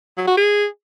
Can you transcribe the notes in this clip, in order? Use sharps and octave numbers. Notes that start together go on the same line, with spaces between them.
F#3
F#4
G#4